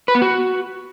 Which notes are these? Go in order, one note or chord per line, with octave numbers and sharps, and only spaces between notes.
B4
B3
F#4